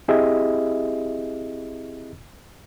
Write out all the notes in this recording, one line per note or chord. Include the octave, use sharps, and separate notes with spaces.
C4 E4 G4 G#4 D#5 E5